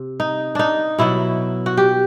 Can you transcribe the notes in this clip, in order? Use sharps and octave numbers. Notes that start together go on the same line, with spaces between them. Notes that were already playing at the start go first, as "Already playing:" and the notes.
Already playing: C3
D#4
D4 D#4
B2 F#3 E4
F#4
G4